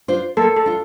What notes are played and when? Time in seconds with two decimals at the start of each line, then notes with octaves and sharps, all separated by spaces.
0.08 D4 F4 C5
0.37 A#3 A4
0.56 A4
0.66 D4 F4